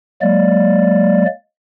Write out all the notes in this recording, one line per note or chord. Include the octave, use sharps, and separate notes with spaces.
F#3 G#3 A#3 D5